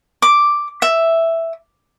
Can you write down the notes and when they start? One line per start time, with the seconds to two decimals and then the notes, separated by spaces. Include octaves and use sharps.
0.22 D6
0.82 E5